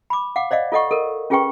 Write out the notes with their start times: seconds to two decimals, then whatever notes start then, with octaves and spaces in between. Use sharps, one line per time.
0.10 B5 D6
0.36 F5 F#5 D6
0.51 C5 D5 D#5 F5
0.72 F4 A4 D#5 F#5 C#6
0.91 A4 A#4
1.30 C#4 F4 G#4 B4 G5 C#6